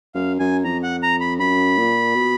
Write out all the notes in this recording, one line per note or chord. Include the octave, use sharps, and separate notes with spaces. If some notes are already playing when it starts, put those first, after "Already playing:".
F#2 F5
F#2 G#5
F2 A#5
F#5
A#5
B5
F#2 B5
A#2
B2